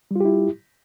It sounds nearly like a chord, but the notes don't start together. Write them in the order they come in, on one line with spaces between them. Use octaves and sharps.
G3 F4 G4 E4